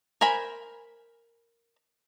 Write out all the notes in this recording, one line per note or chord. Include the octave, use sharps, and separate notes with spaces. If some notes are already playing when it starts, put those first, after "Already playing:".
A#4 C5 G#5 B5